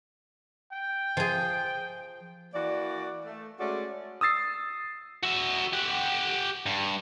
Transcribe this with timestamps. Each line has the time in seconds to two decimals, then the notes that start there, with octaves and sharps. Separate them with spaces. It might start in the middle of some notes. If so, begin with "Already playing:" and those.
0.73 G5
1.17 F3 G#4
2.54 E3 A#3 F#4 D5
3.25 A3
3.59 G#3 A3 C#4 F#4 D5
4.21 D#6 E6 A6 C7
5.23 F#4 E5
5.73 G4 F#5
6.66 G2